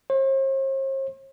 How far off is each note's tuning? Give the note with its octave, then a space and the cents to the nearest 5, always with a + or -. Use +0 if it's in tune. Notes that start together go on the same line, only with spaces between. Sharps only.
C5 +45